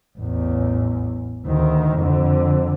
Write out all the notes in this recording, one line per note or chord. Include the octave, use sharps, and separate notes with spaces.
A1 E2
D2 D#3
F2 D3